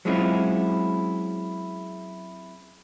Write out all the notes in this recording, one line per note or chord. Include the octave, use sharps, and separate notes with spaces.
F#3 G#3 C4 C#4 E4 F4